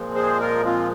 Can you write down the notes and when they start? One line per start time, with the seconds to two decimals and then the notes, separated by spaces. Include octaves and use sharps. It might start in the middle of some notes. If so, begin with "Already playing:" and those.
Already playing: A#2 F3 G#3 C4
0.15 G#4 C5
0.40 F4 A#4
0.65 C4 F4